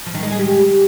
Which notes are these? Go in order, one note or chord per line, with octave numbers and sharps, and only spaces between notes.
F3
D#3
G#3
G#4
G4